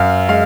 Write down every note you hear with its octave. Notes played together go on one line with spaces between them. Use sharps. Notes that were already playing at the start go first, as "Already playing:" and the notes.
Already playing: F#2 F5
G#3 F5